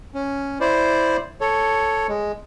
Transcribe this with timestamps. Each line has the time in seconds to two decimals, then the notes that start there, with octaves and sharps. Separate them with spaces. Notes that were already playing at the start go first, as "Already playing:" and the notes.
0.14 C#4
0.60 E4 C5 D5
1.41 A4 C#5
2.09 G#3